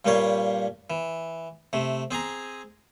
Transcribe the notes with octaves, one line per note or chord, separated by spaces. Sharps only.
G2 A#2 G3 A#3 C#5
E3
C3 A3
C4 G#4 G#5 A#5